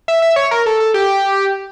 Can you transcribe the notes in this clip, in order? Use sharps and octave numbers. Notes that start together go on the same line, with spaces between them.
E5
E5
C#5
A#4
A4
A4
G4